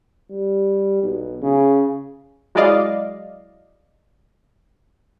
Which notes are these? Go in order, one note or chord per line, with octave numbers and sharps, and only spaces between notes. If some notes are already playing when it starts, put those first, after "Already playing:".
G3
B1
C#3
F#3 G#3 E4 D5 D#5 F5